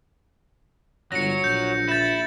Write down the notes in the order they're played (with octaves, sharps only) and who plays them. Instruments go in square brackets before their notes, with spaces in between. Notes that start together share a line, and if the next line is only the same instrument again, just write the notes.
[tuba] G1 [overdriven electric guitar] F#3 [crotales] A#6 C#7
[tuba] A#1 [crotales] G6
[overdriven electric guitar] E4 [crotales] G6 A6